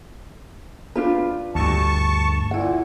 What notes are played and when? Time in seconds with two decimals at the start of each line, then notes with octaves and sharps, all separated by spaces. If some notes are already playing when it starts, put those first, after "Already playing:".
0.96 D4 F4 B4
1.55 D2 G2 A5 C#6
2.51 A#2 E4 F#5